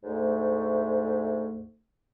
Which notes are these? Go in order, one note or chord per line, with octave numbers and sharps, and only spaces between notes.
D2 G#2 A3